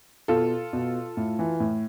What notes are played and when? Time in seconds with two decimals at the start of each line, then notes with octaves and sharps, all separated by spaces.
0.28 B2 F4 A4
0.73 B2
1.17 A2
1.39 E3
1.60 A2